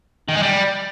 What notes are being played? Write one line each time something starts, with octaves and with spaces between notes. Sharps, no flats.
D#3
G#3
G3